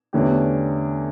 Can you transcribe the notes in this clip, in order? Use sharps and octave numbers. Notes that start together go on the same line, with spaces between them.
E2 D3 A3 C#4 G4